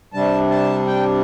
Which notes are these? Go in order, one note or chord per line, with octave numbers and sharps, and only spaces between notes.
C3 G3 D4 A5
A5
G5